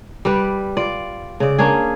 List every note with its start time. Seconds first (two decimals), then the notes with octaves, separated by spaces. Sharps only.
0.25 G3 G4 B4 D5
0.77 F4 D5
1.40 C#3 D5
1.58 A#3 C#4 D4 G#4